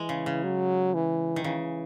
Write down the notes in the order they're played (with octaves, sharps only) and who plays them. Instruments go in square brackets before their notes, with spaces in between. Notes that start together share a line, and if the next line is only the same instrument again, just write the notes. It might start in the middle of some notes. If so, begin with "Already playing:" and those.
Already playing: [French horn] E3 [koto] G#3
[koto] C#3
C#3
[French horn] F#3
E3
[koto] D#3
[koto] C#3 [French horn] E3